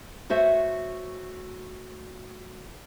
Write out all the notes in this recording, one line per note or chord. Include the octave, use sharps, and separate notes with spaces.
A3 F#4 C5 C#5 E5